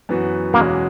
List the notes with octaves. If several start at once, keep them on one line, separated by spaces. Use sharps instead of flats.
F#2 E3 B3 F#4 B4
E2 B2 G#3 A#3 C#4 F#4